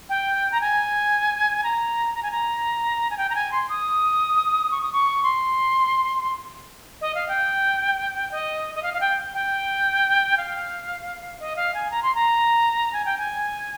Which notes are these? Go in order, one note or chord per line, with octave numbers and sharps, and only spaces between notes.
G5
A#5
G#5
A#5
A#5
G#5
A#5
G#5
G5
A#5
G#5
C6
D#6
C#6
D#6
C#6
C6
D#5
F5
G5
D#5
D#5
F5
F5
G5
G5
F5
D#5
F5
G#5
A#5
C6
A#5
G#5
G5
G#5